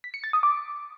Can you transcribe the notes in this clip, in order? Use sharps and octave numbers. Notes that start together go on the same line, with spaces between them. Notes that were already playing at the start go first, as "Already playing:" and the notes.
B6
C#7
A6
D#6
D6